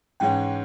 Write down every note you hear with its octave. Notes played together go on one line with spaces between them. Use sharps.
G#2 E3 G#3 C#4 G5